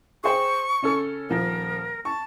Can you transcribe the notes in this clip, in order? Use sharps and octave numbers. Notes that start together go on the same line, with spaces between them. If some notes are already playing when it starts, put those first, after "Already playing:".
G#4 C5 G5 C#6
C#3 C#4 A4
D#1 F3 A#4
A5 C#6